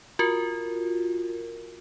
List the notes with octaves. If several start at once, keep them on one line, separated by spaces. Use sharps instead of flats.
F4 F#4 A#4